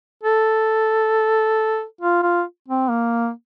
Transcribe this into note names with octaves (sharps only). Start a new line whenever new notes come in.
A4
F4
F4
C4
A#3